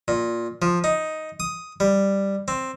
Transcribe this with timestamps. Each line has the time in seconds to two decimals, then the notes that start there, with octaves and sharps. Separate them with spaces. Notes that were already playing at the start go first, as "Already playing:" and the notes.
0.08 A#2
0.62 F3
0.84 D#4
1.40 D#6
1.80 G3
2.48 C4